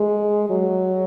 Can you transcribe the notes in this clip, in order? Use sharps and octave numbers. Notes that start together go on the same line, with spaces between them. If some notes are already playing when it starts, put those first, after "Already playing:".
Already playing: G#3
F#3